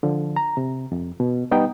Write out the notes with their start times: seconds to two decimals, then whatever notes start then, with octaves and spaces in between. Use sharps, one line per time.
0.03 D3 F3
0.36 A#5
0.57 C3
0.92 F2
1.20 B2
1.51 G3 B3 D#4 G5